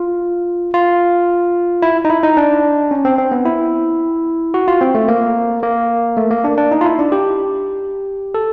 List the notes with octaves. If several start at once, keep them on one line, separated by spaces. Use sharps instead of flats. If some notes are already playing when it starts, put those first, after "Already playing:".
Already playing: F4
F4
E4
D#4
E4
D#4
D4
C#4
C4
C4
B3
E4
F#4
F4
C4
A3
A#3
A#3
A3
A#3
D4
D4
D#4
F4
E4
D4
G4
A4